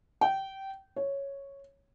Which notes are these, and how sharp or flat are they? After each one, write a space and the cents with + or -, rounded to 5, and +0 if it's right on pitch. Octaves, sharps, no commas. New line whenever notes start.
G5 -20
C#5 +0